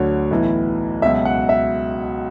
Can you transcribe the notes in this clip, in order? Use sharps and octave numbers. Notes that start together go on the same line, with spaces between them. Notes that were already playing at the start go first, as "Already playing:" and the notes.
Already playing: D2 D3 F#3 C#5
B1 A2 E3
C#2 B2 F#3 E5
F#5
E5